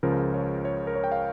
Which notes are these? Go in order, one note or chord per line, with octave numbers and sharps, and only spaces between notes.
C#2 C#3 F3 A#4
C#5
C#5
A#4
C#5
G5
F5